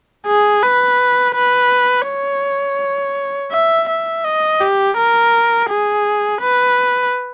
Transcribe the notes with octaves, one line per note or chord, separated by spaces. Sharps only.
G#4
B4
B4
C#5
E5
E5
D#5
G4
A#4
G#4
B4